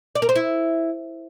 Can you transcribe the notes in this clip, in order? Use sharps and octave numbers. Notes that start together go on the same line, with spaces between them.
D5
A#4
C5
E4